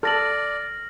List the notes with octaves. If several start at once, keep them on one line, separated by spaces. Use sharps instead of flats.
A4 D5 F6 A#6 F#7